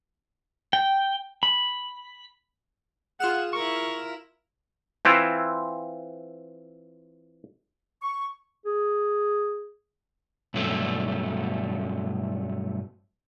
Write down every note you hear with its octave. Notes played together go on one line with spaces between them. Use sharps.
G5
B5
F4 G#4 F#5 F6 E7
E4 A#4 C#6
E3 C4 E4 F4
C#6
G#4
G2 B2 F#3 A3